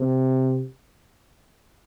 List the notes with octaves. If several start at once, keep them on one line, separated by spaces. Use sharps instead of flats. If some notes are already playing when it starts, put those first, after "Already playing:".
Already playing: C3